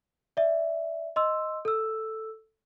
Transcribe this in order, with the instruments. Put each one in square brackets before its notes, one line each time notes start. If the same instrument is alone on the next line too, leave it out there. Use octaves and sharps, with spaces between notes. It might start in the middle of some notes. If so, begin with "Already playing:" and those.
[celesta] D5 E5
D#5 C6 E6
A4 E6